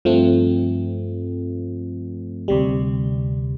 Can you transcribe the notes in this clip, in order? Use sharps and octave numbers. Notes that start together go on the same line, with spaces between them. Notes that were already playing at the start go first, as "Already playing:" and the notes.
G2 F3 A3 C4
D2 C3 G3